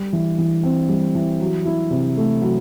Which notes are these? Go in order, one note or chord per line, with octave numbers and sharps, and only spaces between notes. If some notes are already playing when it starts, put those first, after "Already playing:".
Already playing: G3
E3
E3
C4
G3
E3
F#3
E4
C3
A3
F#3